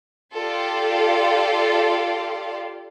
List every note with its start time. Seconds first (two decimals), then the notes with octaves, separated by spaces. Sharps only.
0.35 F4 G4 A4 D5 F5 C6